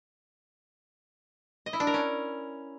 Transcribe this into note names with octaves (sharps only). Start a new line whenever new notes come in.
D#5
E4
D4
A#4
C#4